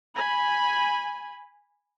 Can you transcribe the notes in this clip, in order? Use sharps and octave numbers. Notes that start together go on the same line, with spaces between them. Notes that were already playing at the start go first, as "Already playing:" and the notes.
G#5 B5